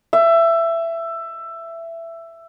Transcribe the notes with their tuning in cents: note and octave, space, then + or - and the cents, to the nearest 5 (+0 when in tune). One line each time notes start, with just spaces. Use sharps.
E5 +15